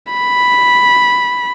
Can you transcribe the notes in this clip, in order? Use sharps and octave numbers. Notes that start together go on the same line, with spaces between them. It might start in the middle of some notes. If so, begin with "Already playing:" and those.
B5